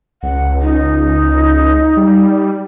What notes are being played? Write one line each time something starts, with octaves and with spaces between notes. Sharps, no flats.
C#2 F#5
D#4
G3